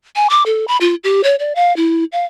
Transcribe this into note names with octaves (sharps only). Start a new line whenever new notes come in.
G#5
D6
A4
B5
F4
G4
C#5
D5
F5
E4
F5